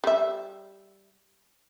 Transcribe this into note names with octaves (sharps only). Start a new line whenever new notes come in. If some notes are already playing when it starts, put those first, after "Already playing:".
G3 E5